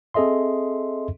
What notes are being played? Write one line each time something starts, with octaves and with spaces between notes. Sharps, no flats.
C4 G#4 A4 D#5 E5 C6